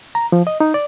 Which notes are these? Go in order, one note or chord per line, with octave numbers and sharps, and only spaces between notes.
A#5
F3
D#5
D#4
D5